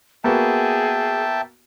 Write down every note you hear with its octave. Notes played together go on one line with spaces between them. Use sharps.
A#3 B3 F#4 G#4 E5 G5 A5